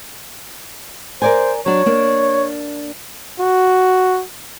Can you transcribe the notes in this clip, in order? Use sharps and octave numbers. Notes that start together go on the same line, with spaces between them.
A#4 C5 D5 G#5
F#3 D4 C#5
A#3 D4
F#4